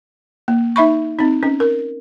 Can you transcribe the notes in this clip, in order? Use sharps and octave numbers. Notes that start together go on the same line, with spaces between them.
A#3
D#4 E5 B5 C#6
C4 D#4
C#4
A#4